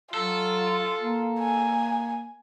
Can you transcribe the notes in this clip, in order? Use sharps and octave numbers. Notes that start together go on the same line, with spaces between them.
F#3 F4 A4
A#3
G#5